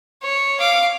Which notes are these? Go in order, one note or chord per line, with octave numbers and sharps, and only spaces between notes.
C#5
F5 D6